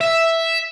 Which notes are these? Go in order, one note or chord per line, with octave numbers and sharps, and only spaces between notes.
E5